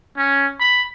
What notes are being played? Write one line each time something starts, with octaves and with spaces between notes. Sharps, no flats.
C#4
B5